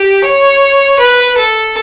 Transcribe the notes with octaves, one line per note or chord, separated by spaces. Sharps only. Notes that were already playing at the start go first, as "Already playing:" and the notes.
Already playing: G4
C#5
B4
A4